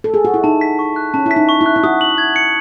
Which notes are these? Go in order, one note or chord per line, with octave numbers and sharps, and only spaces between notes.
A4
G#4
F#4
E4
D#4 A5
B6
C#6
F#6
C#4 A5
E4 B6
D#4
C#6
E4
F#6
E4
F#4 D#6
F#7
G#6
C#7